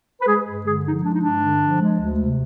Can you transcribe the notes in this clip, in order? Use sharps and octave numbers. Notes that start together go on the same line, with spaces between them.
B4
G#3 G#4
G2
D3 G#4
F3 D#4
G#3 D4
D#4
G2 D4
D3
F3
G#3
D2
C3